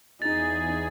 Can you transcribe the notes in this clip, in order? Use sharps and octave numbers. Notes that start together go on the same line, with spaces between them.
E2 D#4 G#4 A6